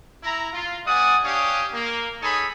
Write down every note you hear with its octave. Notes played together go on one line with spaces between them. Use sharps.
E4 A#5
F4
G3 B3 D5 F#5 G#5 D#6
D4 G4 C#5 F5 G#5 D#6
A#3
D#4 G#4 A4 C#5 G#5 B5